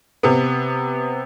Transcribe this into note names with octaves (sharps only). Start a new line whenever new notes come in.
C3 B3